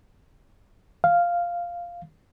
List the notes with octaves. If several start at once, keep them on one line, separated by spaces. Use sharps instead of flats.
F5